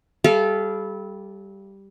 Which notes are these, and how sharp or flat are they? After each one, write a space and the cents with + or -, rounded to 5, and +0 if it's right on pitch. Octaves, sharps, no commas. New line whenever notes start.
G3 +0 A4 -25 F5 -25